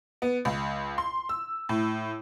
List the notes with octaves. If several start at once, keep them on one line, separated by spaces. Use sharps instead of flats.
B3
C#2
C6
E6
A2